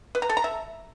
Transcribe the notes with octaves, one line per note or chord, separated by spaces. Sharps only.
B4
A#5
A4
A#5
E5